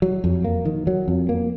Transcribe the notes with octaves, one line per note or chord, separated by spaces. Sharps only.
F#3
F2
A#3
D#3
F#3
F2
A#3